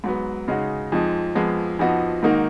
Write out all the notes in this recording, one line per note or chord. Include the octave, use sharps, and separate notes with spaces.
G#2 F#3 B3
C#3 G#3 D#4 F#4
F2 F3 G#3 D#4
F2 F3 G#3 B3
F2 F3 B3 D#4 F#4
G#2 D#3 A#3 D#4 F#4